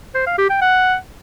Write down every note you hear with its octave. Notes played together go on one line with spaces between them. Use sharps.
C5
F5
G4
G5
F#5